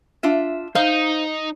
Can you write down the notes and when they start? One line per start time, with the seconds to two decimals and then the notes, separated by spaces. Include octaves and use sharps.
0.23 D4 F4 E5
0.75 D#4 C5 F5